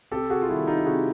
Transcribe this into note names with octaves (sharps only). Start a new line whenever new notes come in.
C3 G4 A4
F#4 G#4
F4
D#3 G3 E4 F#4
D#4 F4
C3 F#4 G#4